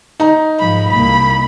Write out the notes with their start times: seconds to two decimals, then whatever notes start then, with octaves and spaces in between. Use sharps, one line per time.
0.20 D#4 A#5
0.59 G#2 F3 B5
0.91 C2 A#3 B5